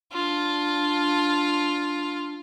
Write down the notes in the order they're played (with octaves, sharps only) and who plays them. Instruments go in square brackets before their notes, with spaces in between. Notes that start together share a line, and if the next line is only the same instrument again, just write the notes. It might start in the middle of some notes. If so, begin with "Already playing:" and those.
[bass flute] D4 [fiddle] F4